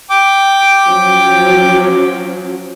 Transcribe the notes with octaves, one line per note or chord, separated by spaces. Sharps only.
G5 D6
F3 F#3 C#4